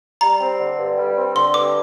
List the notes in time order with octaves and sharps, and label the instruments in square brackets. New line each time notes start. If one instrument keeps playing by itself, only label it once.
[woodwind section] G3 [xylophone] A#5
[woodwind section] C4
D3
G2
G3
C4
[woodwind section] D3 [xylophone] C6
[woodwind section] G2 [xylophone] D6